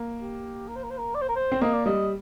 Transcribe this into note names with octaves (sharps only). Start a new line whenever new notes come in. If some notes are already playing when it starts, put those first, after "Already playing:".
Already playing: A#3
G4
A#4
C5
A#4
C5
A#4
D5
C5
A#4
C5
C4
A#3 D#5
D5
G3 D#5